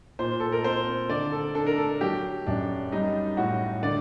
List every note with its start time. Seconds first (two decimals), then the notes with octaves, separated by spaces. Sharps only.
0.19 A#2 C5
0.40 A4
0.52 A#4
0.64 C4 C5
1.09 D3 D5
1.32 A4
1.55 D4 A4
1.66 A#4
1.78 A4
2.01 F#3 G4
2.47 F#2 D4
2.92 G3 D#4
3.37 A2 F#4
3.83 D3 D5